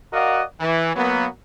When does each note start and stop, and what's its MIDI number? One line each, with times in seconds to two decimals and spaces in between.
0.13 0.42 66
0.13 0.42 70
0.13 0.42 74
0.13 0.42 75
0.13 0.42 77
0.13 0.42 78
0.60 0.93 52
0.95 1.27 54
0.95 1.27 58
0.95 1.27 59